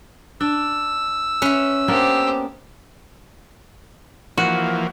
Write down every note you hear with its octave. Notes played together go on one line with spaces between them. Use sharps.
D4 E6
C#4 B4 E5
A#3 B3 D4 G4 C5
E3 F3 A#3 F#4